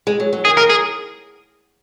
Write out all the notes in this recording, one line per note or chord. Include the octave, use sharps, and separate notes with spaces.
G#3
F#3
F#3
D#3 G#4
A#4
G#4